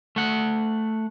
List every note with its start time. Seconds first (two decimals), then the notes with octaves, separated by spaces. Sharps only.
0.16 A3 F#5